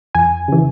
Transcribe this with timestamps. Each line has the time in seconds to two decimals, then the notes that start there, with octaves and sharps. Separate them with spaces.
0.15 F2 G#5
0.48 C#3 E3